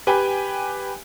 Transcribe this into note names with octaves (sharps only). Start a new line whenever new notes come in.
G4 B4 G5 G#5